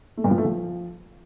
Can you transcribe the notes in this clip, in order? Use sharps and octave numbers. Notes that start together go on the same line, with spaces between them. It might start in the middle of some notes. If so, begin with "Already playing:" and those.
A3
G2
F3
A3
F3